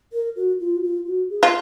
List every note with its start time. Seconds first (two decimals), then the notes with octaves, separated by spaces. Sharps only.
0.13 A#4
0.36 F#4
0.60 F4
0.76 F#4
0.83 F4
1.06 F#4
1.30 G#4
1.43 F4